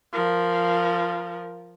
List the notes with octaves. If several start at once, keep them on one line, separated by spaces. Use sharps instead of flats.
F3 A#4